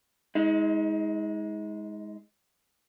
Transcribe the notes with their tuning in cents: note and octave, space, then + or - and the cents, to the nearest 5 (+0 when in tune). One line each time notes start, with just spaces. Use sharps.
G#3 +0 D#4 +40